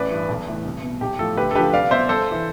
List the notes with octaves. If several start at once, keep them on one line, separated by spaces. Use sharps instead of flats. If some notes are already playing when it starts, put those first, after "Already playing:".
Already playing: A1 B4 D5
G2 E3
B1
A2 E3
C2
B2
B1 G4
A2 F3 A4
D2 G4 B4
A4
D3 F3 G4 B4
C2 D5 F5
B2 C5 E5
G1 A4 C5
E3